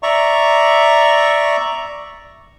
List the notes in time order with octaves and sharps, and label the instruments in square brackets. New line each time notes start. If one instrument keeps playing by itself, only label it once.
[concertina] D5 E5 A#5 C#6